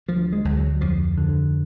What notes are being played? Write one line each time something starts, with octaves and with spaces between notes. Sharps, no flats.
D2 F3
G#3
D2
F#3
F2 F3
D3